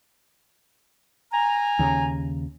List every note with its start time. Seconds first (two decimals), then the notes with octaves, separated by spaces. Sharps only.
1.33 G#5 A#5
1.79 D#2 C#3